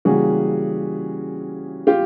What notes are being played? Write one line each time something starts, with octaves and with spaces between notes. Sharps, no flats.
C#3 E3 G3 A#3 F#4 G#4
F4 G4